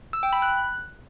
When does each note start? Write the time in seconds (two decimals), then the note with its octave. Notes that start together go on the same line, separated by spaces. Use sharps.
0.13 E6
0.23 G5
0.33 B5
0.42 F#6